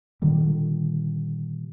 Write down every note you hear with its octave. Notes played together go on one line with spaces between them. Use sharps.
A#2 D3 D#3 G3